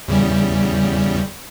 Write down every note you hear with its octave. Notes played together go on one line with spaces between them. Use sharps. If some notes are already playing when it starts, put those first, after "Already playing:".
E2 C#3 G3